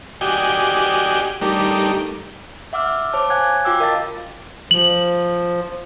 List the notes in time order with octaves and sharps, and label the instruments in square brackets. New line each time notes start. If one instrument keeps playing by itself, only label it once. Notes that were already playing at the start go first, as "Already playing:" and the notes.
[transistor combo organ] F#4 G4 D5 D#5 G5 G#5
G3 A3 D#4 G4 A#4 D5
[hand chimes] E5 F#5 D6 E6 F6
C5 C#5 A5 D6
F5 G#5 F#6 G#6
F4 F#4 G5 D6 E6
A#4 D#5 F5 A5 A6
[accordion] F3 [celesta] F#7